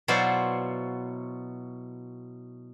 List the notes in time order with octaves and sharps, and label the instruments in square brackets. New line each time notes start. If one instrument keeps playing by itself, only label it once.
[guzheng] B2 F#3 E4 F4 C5 D5